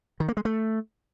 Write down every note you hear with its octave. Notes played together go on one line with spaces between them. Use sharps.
D#3
A#3
G#3
A3